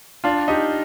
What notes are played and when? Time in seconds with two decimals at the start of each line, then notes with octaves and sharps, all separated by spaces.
0.24 D4 F4
0.48 D#4 G4